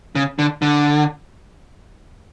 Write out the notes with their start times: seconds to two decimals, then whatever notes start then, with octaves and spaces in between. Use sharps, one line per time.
0.15 C#3
0.39 D3
0.62 D3